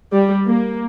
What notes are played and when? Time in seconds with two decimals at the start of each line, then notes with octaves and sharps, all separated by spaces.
0.13 G3
0.46 A#3